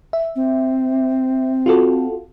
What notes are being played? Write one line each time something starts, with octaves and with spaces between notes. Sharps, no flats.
E5
C4
F4 F#4 A4